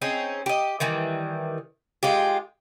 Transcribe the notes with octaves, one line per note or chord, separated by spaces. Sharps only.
C4 C#4 D#4 G#4
G4 D#5
D#3 E3 G3
G#3 F4 G4